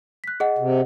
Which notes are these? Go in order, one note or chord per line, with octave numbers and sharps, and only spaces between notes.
F#6 B6
G#4 D#5 F#5
C3